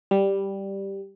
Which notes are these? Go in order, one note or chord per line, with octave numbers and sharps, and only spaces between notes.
G3